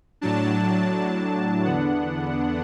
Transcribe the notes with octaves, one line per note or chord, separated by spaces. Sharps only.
A2 F#3 D4 A5
E2 D3 B3 D4 F#5